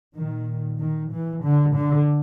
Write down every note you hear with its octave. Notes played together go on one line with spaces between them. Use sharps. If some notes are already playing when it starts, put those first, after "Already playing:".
A#2 D#3
D#3
E3
D3
D3